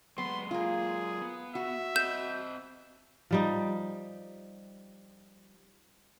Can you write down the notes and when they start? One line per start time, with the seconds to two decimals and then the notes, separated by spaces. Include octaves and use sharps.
0.18 F#3 G#3 B3 C6
0.51 A#3 F4 G#4
1.22 B3
1.55 F#4 E5
1.96 C4 D#5 G6 E7
3.31 F3 G3 D#4